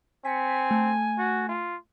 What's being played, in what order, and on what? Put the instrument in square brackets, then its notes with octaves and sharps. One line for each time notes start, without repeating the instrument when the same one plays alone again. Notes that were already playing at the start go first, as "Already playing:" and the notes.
[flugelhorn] C4 [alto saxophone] G#5 [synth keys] B6 C#7
[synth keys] A3
[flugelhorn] F#4
F4